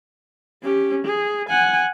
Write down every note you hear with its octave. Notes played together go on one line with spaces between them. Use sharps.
C#4 G4
G#4
F#5 G#5